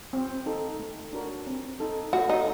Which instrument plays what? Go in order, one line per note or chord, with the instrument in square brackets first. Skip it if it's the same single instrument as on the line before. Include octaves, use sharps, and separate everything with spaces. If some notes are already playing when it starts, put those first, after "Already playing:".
[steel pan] C4
D#4 A4
A3
D4 F#4 A#4
C4
D#4 A4
[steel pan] A3 [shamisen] F#4
[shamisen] D#4